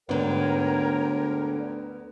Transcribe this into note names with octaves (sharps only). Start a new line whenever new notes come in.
D2 G#2 D3 B3 A#4 C#5 G5